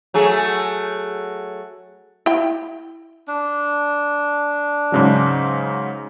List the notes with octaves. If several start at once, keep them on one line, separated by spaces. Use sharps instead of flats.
F#3 A3 G#4
E4 G5
D4
G#2 C#3 F#3